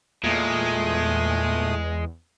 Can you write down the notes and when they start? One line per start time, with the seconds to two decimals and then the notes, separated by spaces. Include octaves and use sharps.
0.24 E2 A#2 G#3 A3 D#6